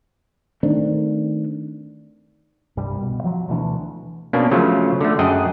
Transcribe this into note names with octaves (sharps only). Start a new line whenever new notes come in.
D#3 A3 C4 D4
C2 G2 C3 G3
B2
F3 F#3
D2 B2 E3 D4
B2 A#3 C#4 D4
C#3 F3 F#3 A3 F4
D3 A3
F#2 G#4 D#5 F#5 G5 A5